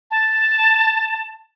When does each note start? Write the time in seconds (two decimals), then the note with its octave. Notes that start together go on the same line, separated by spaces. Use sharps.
0.11 A5